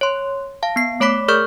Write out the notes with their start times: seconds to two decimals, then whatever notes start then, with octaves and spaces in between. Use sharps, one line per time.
0.01 C#5 C6
0.63 F5 A5
0.76 B3 C7
1.00 A3 C#5 B5 D6 B6
1.28 G#4 A#4 D5 C#6 F6 G6